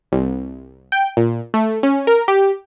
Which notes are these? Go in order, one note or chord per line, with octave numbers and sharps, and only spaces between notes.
C2
G5
A#2
A3
C#4
A#4
G4